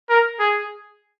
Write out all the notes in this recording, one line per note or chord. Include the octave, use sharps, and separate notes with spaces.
A#4
G#4